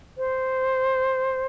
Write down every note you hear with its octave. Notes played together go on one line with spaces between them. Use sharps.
C5